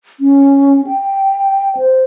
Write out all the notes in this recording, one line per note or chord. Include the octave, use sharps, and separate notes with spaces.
C#4
G5
C5